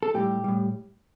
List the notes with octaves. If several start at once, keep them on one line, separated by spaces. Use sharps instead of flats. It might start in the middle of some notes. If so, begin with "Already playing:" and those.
A4
A2 G3 G4
A2 G3